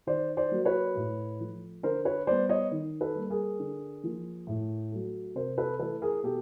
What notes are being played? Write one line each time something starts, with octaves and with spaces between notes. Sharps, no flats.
D#3 C5 D5
C5 D5
F#3 A#3
B4 C#5
A2
F3 A3
D3 A#4 C5
B4 C#5
G3 B3 C5 D5
C#5 D#5
D#3
A4 B4
G3 A#3
G#4 A#4
D3
F3 A#3
A2
F#3 A3
C3 A#4 C5
A4 B4
E3 A3 A4 B4
G#4 A#4
B2 G4 A4